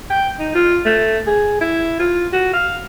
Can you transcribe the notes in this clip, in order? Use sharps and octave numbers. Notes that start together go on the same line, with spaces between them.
G5
D#4
F4
A3
G#4
E4
F4
F#4
F5